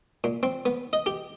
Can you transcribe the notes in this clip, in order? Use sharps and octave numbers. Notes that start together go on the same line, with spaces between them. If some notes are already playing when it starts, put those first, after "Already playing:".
A#2
C4
B3
D#5
G4